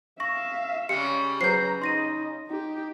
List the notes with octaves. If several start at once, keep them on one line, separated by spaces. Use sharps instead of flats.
E5 F5 C#6 A#6
C#3 G3 G#3 G4 C#7
F#3 G#4 B4 C5 A#5 G6 C7
D#4 D#5 C6 A#6 D#7
D#4 G4